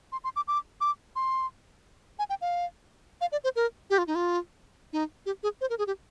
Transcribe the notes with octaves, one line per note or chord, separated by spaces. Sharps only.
C6
C6
D6
D6
D6
C6
G#5
G5
F5
F5
D5
C5
A#4
G4
F4
D#4
F4
D#4
G4
G#4
C5
A#4
G#4
G4